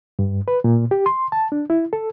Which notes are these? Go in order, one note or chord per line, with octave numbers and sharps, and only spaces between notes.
G2
B4
A#2
G4
C6
A5
D4
E4
A4